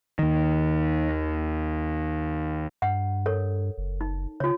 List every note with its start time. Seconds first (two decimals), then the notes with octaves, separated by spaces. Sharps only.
0.19 D#2 D#3
2.82 G2 F#5
3.26 A4 A#4 C#5
3.78 F#1
4.01 D#4
4.40 C#3 F4 C#5